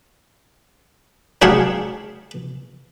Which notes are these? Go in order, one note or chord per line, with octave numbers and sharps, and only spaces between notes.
F#3 D4 G4 G#4 F5 F#5